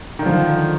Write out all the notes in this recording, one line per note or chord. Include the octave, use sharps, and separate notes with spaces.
D3 D#3 F3